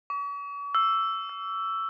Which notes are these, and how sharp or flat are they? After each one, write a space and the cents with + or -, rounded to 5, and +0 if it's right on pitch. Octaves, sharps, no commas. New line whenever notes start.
C#6 +45
E6 +10
E6 +10